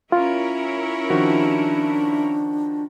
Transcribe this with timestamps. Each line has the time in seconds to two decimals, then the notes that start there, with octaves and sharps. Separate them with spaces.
0.12 C#4 E4 F4 A#4
1.10 D#3 F3 D4 F#4